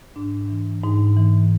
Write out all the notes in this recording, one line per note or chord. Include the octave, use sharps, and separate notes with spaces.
G#2 D4
E3
G#2 D#4
E3